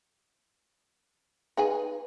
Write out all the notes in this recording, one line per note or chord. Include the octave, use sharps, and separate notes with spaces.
D#4 G#4 B4 G#5